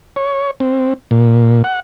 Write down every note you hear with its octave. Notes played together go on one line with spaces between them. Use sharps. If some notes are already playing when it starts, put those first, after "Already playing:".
C#5
C4
A#2
F#5